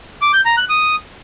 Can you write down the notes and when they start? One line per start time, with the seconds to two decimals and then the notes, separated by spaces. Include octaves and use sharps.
0.22 D6
0.33 G6
0.45 A#5
0.57 F#6
0.69 D#6